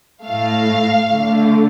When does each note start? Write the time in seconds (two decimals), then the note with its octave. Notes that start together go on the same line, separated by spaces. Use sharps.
0.25 A2 A3 F5
1.09 D3 A3